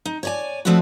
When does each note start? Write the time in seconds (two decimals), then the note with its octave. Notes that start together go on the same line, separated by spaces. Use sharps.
0.05 D#4
0.23 C#5 D5 G#5
0.65 F3 A3 C4 D4 E4 F#4